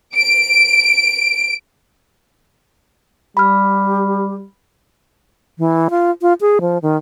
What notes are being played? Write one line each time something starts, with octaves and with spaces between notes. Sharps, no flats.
D7
G3 G4 B5 F6
E3
F4
F4
G#4
F3
D#3